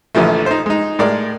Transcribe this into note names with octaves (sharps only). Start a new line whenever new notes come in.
A#1 D3 E3 F3 A3
D#4 C5
G#3 D#4
A2 G#3 A#4 D5